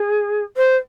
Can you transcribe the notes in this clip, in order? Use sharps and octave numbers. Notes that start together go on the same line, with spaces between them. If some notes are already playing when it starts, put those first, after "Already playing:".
Already playing: G#4
C5